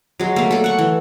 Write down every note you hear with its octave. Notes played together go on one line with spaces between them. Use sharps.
F#3 G#3
A3 A#3
A4 D5
F#5 C#6
E3